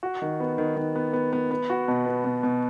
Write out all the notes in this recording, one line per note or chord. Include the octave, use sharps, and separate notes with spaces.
F#4
D#3
B3
D#3
D#3
B3
B3
B3
B3
F#4
B2
B3
B2
B2